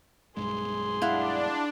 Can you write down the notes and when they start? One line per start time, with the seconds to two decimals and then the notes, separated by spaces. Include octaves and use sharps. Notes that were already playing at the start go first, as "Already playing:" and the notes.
0.37 B1 G2 G#3 G#4 C6
1.02 D4 E4 F5 F#5